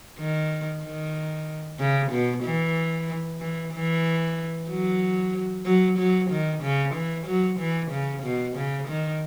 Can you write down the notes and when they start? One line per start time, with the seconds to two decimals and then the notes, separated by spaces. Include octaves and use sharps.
0.18 D#3
0.83 D#3
1.79 C#3
2.11 B2
2.44 E3
3.40 E3
3.73 E3
4.69 F#3
5.66 F#3
5.98 F#3
6.30 D#3
6.62 C#3
6.94 E3
7.27 F#3
7.59 E3
7.91 C#3
8.23 B2
8.56 C#3
8.88 D#3